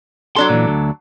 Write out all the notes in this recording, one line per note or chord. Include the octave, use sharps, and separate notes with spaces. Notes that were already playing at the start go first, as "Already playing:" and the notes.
F#3 D4 A4 C6
A#2 E3
D2